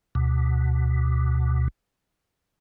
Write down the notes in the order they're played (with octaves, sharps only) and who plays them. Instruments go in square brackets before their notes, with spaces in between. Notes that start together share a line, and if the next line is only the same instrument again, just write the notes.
[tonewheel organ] D2 B2